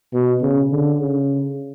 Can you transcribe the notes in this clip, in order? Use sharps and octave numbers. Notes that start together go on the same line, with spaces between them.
B2
C#3
D3
C#3